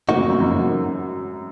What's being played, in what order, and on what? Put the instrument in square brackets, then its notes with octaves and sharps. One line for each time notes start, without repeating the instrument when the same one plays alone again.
[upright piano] A2 [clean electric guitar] C#3 F3 A#3 D#4 F#4
[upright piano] F#2
F#2
F#2
F#2